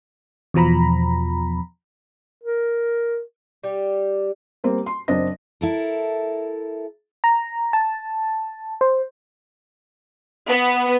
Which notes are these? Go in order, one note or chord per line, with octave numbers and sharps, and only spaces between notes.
E2 B2 F3 A#5 B5
A#4
G3 G4
G3 A#3 C4
C6
F#1 C4 D4 D#5 A#6
E4 A4 A#4
A#5
A5
C5
B3